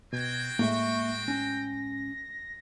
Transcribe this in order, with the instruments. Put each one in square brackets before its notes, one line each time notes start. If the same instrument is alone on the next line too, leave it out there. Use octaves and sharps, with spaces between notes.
[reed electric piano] B2 [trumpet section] C4 F#4 G5 [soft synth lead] G#6
[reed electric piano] A2 G#3 [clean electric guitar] A#3 E5 [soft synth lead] C#6
[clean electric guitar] C#4 [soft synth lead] A#6